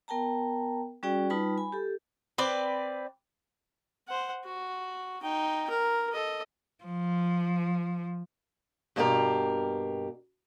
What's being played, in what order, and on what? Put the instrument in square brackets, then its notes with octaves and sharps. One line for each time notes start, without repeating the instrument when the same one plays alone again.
[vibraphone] B3 A#4 G5 A5 A#5
G3 C#4 F#4 G#4 D5 G5
G3 D#4 F4 B4 A5 B5
G#5 B5
G4 A4
[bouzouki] C4 B4 D5
[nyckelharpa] C5 F#5
F#4
D#4 G5
A#4
A4 D#5
[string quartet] F3
[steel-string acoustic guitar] G2 B2 A#3 F4 G4 A#4